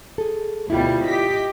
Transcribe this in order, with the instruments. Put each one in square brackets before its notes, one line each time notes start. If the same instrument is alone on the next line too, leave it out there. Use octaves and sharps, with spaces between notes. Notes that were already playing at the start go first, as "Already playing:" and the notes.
[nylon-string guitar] G#4 A4
[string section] D2 B2 G3 [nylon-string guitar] E4 F4
[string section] G4 D#5 B6